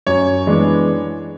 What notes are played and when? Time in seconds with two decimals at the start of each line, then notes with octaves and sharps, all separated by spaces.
0.07 F#2 C#5
0.47 E3 G#3 B3 D4